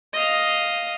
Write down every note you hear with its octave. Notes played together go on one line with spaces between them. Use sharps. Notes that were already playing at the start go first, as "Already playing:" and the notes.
D#5 F5